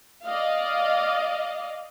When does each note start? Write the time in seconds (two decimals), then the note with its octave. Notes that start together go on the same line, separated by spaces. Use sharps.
0.24 D5 D#5 F5